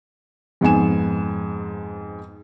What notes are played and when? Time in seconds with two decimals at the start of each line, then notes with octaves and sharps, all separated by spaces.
0.61 F2 G#2 B3 G#5 E7